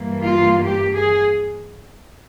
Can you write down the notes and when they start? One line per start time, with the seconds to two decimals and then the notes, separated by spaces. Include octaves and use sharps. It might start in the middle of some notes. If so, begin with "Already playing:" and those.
Already playing: G2 E3 A#3
0.22 F4
0.65 G4
0.95 G#4